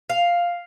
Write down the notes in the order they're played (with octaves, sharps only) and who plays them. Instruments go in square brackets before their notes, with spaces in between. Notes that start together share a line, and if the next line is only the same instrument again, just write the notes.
[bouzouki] F5